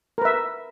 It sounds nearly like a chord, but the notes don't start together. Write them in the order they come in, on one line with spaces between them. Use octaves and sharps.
A#4 B4 E5